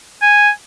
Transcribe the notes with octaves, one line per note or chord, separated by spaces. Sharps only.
G#5